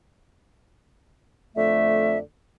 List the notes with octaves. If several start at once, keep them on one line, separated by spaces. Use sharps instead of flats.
F2 D3 A3 E5